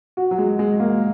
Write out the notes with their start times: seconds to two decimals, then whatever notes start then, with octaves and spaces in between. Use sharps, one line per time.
0.17 F#4
0.31 F#3
0.38 G#3
0.59 G#3
0.80 A#3